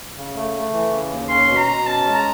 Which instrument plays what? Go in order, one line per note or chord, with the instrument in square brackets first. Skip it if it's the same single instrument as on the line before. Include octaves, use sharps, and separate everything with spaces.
[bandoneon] C#3
A3
A3
E3
C#3
D#2
[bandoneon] C#4 [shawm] C6
[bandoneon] B2
[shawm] A#5
[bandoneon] B2
[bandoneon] C#4 [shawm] A5
[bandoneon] G#3
[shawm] A#5